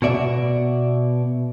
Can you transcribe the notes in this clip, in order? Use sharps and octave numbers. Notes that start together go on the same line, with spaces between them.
B2 F#4 D5 E5